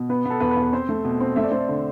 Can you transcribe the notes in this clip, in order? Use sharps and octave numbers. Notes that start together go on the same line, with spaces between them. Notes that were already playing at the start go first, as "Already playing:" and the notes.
Already playing: B2
B3 B4
B3 A4
E2 B4
B4
E2
B4
C4 C5
A3
B2
C4
A3 E5
D5
A3 C5
D5
D3